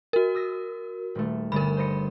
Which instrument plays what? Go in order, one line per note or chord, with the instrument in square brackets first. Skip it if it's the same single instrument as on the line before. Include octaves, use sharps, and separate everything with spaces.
[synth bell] F#4 A#4
[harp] D#6 E6 A#6
D#1 A3
[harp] G1 D5 [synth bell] A#4 B5
[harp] C5 D#5 C#7